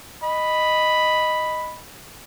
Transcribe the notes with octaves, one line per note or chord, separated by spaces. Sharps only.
D#5 B5